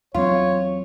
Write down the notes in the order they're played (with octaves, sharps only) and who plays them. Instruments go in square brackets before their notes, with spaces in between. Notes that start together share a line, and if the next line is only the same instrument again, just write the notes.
[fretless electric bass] E2 F#3 C4 [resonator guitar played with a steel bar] F4 [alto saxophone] C#5